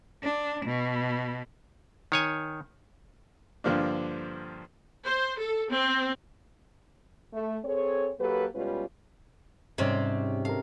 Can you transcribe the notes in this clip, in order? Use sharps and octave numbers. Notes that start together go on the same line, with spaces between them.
D4
B2
D#3 C#5 G#5
G2 D3 F3 A#3 D4
C5
A4
C4
A3
C4 G#4 A4 C#5
F#3 A#3 G4 A4 B4
B2 G3 G#3 C#4 F4 B4
G#2 C3 G3 C4 C#4
A4 A#4 F5